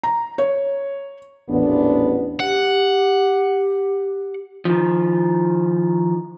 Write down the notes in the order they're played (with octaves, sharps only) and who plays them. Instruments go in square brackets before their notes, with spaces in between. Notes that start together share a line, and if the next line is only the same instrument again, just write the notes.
[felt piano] A#5
C#5
[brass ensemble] A1 E2 B3 [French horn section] A#2 F3 D4
[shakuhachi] G4 [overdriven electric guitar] F#5
[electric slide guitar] D#3 F3